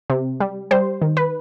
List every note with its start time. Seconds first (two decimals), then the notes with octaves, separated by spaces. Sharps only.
0.10 C3
0.40 G3
0.71 G3 C5
1.02 D#3
1.17 B4